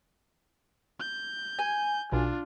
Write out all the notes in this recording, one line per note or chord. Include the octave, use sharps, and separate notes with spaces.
G6
G#5
B1 D4 F4